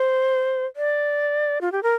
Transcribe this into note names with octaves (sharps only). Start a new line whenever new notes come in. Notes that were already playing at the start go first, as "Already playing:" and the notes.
Already playing: C5
D5
F4
G4
A#4